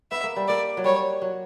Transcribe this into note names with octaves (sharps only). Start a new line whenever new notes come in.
B3 E5
A#3
G3
A#3 D5
F#3
G3 C#5
F#3